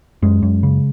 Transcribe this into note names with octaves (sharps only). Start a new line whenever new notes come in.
F#2 G#3
F#2
C#3